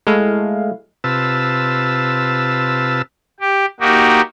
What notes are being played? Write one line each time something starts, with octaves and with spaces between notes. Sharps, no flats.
G#3 A3 E4 F5
C3 F4 B4 A5 E6
G4
A#3 D#4 F#4 G4